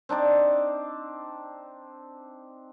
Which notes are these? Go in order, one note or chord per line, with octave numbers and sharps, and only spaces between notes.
C4 D4 D#4 D5